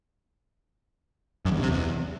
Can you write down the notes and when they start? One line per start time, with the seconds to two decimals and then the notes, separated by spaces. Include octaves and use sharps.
1.45 F#2
1.51 E2
1.57 G2
1.63 C3
1.68 E2